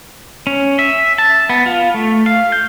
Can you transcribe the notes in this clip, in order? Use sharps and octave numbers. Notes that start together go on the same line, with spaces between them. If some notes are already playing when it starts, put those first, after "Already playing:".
C#4
E5
A5
B3
F4
A3
F5
G6